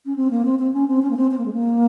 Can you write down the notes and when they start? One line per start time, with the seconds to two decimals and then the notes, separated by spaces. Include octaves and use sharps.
0.06 C#4
0.16 C4
0.31 A#3
0.45 C4
0.59 C4
0.74 C#4
0.88 C4
1.02 C#4
1.11 A#3
1.17 C4
1.31 C4
1.38 A#3
1.46 G#3
1.53 A#3